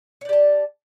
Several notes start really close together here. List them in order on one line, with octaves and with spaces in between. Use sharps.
C#5 D5 G4 A5